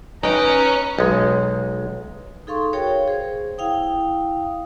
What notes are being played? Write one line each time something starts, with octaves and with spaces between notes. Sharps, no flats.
C#4 D#4 B4 G5 A#5
B1 G#3
D#4 G#4 A4 F5 C6 C#6
F#4 G#4 A#4 C#5 F5 G5
G#4 C5
E4 F5 G5 D#6